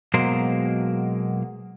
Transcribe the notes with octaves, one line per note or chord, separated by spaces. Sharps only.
B2 F#3 G#3 A#3 A#4 C5